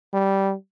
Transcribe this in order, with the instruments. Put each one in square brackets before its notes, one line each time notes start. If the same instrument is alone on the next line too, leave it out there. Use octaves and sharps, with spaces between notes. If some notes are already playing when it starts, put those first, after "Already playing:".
[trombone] G3